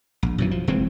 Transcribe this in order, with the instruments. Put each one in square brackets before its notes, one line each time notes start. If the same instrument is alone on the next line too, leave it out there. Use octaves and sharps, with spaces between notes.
[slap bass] A#1
F#2 B2 E3
F3
F1 E3 G#3 C4